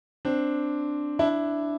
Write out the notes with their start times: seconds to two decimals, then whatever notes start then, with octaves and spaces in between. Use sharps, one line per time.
0.25 C4 D4
1.19 D4 E4